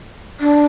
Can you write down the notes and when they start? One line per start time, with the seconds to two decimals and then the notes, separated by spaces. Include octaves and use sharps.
0.40 D4